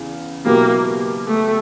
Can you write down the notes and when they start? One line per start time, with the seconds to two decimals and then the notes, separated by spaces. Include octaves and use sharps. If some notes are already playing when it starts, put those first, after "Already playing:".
Already playing: E2 C#3
0.45 B2 F#3 A#3 B3 E4 G4
1.27 A3